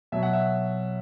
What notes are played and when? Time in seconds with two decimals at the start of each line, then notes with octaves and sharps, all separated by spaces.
0.12 B2 F#3 E5
0.23 F#5
0.33 E5